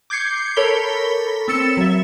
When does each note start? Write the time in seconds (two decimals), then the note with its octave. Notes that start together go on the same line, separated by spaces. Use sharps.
0.10 D6 G6 G#6 C7 C#7
0.56 A4 A#4 C#5 B5 B6 G7
1.48 C4 E6 A6 C#7 E7
1.77 F#3 E5